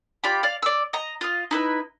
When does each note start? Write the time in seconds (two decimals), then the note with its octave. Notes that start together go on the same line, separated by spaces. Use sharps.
0.24 F4 G4 D5 B5
0.43 D5 F5
0.62 D5 E6
0.93 D#5 A#5
1.21 F4 D#5
1.51 D#4 E4 B4